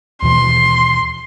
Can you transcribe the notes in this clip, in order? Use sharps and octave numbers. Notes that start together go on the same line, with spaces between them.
D#2 B2 E3 C6